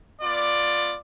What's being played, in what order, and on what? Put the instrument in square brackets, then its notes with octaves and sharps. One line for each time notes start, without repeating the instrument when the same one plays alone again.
[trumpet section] B3 F4 D5